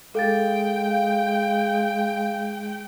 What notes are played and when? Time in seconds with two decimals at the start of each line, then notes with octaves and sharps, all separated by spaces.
0.15 G#3 A4 F5 G5 A6